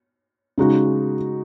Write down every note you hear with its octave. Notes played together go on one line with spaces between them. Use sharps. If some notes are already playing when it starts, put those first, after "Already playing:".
C#3 G#3 D#4 F#4